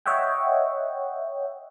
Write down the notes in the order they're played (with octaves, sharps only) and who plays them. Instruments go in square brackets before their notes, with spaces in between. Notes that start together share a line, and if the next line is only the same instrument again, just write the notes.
[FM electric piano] C#5 D#5 E5 F#5 G5